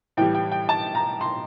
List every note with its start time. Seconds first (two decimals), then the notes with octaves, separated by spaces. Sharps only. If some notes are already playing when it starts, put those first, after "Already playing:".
0.17 A2 E3 G3 G5
0.35 G5
0.52 G5
0.69 A5
0.95 A#5
1.21 C6